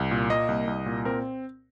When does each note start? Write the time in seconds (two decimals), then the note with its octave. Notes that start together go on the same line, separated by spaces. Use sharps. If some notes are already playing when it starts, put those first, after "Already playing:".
Already playing: C2
0.11 A#2
0.30 A#3 D#5
0.49 C2
0.67 C2
0.86 A#2
1.05 C4 A#4